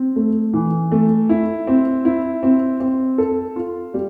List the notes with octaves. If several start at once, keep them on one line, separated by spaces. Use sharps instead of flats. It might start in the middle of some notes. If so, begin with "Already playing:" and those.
Already playing: C4
A3
E3
A3
E4
C4
E4
C4
C4
A4
F4
G3